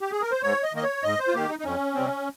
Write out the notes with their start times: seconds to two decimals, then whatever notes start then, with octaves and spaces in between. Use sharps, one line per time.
0.01 G4
0.12 G#4
0.21 A#4
0.31 C5
0.43 G#2 C#5
0.63 D#5
0.73 D#3 A#3 D#5
0.83 C#5
1.03 G#2 D#5
1.19 C5
1.28 F4
1.34 D#3 A#3 G4
1.49 D#4
1.59 D#4
1.65 F2 C#4
1.95 C3 G3 C4